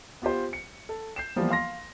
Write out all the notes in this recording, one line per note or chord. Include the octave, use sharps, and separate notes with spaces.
B3 F4 G4 C5
C#7
A4
G6 C7 E7
E3 F3 G3 A#3 B3 F4
F5 C6 A#6